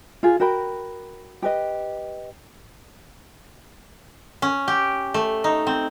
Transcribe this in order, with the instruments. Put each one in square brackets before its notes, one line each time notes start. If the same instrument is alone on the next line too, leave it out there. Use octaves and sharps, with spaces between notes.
[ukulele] F4 G#4
F#4 A#4 G5 B5
G4 B4 D#5
[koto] C#4
G4
A3
D#4
C4